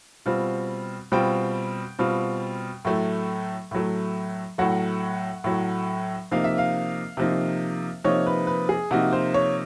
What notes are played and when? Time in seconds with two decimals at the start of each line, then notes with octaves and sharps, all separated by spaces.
0.26 B2 G3 C4 F4
1.12 B2 G3 C4 F4 G5
1.99 B2 G3 C4 F4
2.85 A2 F#3 A3
3.71 A2 F#3 A3
4.58 A2 F#3 A3 F#5
5.44 A2 F#3 A3
6.32 C3 F3 A#3 D#4 F5
6.44 E5
6.58 F5
7.17 C3 F3 A#3 D#4
8.04 C3 F3 A#3 D#4 C#5
8.27 B4
8.47 B4
8.69 G#4
8.91 C3 F3 A#3 D#4 F#4
9.13 C5
9.34 C#5